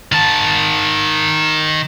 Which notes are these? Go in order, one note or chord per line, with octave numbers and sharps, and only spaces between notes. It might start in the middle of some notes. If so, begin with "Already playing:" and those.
D#3 A5